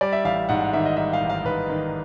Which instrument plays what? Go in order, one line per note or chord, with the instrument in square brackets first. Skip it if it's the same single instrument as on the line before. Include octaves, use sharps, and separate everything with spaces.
[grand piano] G3 D5
E5
A1 F5
G#2 F#5
F#5
D#3 E5
D#5
G3 E5
F5
A1
F5
G#2 B4
D#3